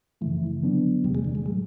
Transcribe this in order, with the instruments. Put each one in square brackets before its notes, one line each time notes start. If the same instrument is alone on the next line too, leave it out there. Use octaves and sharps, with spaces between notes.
[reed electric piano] F#2 C#3 F3 A3 [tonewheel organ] E3
[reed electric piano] D3 F#3 B3 D4
[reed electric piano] E2 C3 E3 A3 [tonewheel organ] G3
[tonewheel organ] G#3
D3
G#3
[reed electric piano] A2 F#3 A3 [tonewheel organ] G#3